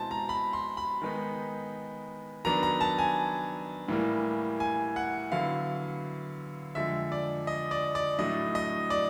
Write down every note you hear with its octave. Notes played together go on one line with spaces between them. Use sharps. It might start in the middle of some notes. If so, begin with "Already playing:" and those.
Already playing: B2 G#3 C4 E4 A5 C6
A#5
B5
C6
B5
D#3 G#3 B3 D#4
D#3 F#3 B3 D4 A#5
A#5
A5
G#5
A2 E3 G3 A#3
G#5
F#5
D3 F#3 B3 E4 F5
F2 D3 F3 G#3 E5
D5
D#5
D5
D5
A2 F#3 A3 D4 D#5
D#5
D5